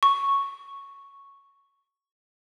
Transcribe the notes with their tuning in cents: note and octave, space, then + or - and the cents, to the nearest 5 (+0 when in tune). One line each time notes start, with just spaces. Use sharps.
C#6 +0